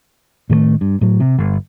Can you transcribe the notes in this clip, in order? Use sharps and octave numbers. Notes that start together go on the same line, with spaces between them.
A2 D#3 G3 A3
G2
A2 F#3
C3
G1